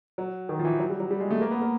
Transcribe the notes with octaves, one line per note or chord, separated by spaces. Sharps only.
F#3
D#3
F3
E3
F#3
G3
F#3
G3
G#3
A3
A#3
B3
A#3